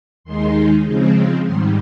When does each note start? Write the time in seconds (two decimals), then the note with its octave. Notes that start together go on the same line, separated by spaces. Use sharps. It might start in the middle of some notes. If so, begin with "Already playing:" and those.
0.24 D#2 D#3 G#3 D#4 C6
0.85 C#3 F3 G#3 C4
1.45 G#2 D#3 G3 C6